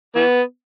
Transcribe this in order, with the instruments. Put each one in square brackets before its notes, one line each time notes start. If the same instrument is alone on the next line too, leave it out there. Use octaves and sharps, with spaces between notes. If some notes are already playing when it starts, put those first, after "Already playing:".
[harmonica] E3 B3